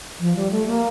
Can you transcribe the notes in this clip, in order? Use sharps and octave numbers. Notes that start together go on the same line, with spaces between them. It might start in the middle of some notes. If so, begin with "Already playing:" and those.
F3
G3
A3
A#3